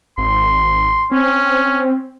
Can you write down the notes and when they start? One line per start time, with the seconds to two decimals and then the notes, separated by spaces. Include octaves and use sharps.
0.18 G#1 C6
1.11 C4 C#4